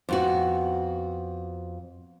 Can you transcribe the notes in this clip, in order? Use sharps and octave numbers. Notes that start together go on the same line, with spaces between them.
F2 B3 F#4